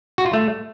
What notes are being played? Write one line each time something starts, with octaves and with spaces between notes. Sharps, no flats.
F#4
F4
A3